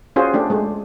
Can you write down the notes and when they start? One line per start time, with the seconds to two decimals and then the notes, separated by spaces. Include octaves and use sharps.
0.16 C#4 F4 F#4 G#4 C5
0.34 A3 D4 G4
0.50 G#3 A3